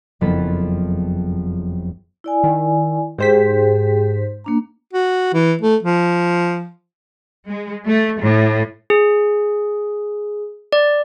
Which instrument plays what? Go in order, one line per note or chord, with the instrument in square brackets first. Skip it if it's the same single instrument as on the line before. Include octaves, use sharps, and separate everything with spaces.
[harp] F#1 F2 B3 F4 A4 B5
[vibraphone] E4 D5 G#5
[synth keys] D#3
[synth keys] G#2 C5 B6 [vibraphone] G4 G#4 G5
[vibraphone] A#3 D4 A#5
[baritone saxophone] F#4
E3
A3
F3
[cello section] G#3
A3
A2
[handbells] G#4
D5